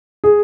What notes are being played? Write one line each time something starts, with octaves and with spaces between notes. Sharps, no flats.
G#4